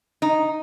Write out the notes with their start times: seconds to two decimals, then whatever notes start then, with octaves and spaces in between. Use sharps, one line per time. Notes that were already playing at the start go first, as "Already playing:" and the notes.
0.22 D#4